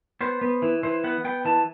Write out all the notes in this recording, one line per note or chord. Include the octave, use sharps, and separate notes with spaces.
B3 C5
B3
E3
E3 C5
B3 F#5
B3 G5
E3 A5